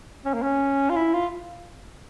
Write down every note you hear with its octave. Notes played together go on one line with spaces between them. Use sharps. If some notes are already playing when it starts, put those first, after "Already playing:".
C#4
A#3
C#4
F4
E4
F4